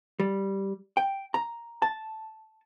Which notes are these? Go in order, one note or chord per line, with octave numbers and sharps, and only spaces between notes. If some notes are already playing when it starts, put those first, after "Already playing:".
G3
G5
A#5
A5